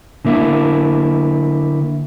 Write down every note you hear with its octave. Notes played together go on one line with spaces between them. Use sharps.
D3 A#3 E4